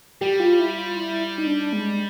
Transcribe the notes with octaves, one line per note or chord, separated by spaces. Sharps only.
G3 G4
F4
E4
F4
E4
D#4
D4
G#3